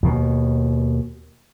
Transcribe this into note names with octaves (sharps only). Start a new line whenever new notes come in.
D#2 B2